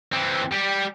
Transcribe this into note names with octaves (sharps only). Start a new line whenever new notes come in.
E3 C4
G3 G4